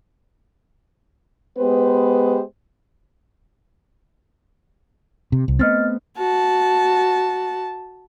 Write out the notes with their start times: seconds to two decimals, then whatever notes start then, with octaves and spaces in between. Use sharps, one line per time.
1.58 G#3 B3 G4 B4 C5
5.32 C3
5.48 C2
5.59 A3 B3 C4 D#5 F6 A6
6.17 F#4 A5